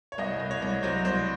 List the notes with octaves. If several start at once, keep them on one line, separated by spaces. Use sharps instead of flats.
C#5
C2 D#5
C2
C#5
C2
F#3 C5
C2 C5